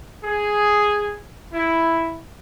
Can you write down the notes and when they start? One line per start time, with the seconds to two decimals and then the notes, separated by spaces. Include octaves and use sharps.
0.24 G#4
1.51 E4